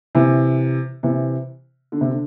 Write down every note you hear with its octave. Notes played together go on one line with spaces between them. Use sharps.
C3 E3
C3 E3
D3
C3
D3